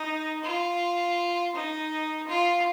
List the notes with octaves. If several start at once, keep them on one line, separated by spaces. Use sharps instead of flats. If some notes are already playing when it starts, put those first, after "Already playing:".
Already playing: D#4
F4
D#4
F4